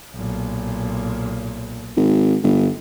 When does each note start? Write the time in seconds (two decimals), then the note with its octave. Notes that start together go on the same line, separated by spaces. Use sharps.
0.13 B1 A#2
1.96 G#1
2.43 G1